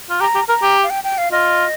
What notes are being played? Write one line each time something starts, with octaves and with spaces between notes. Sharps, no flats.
F4
G4 A#5
G4
A#4 A#5
G4
F5
G5
G5
F5
F4 D#5